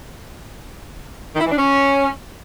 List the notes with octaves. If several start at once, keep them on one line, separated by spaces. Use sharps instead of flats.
D#3
E4
E3
D4
C#4